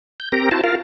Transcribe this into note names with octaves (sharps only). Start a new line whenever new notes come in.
G6
C4 G4 A#4 A#5
E4 F#4 C5 A5
F4 A#4 F5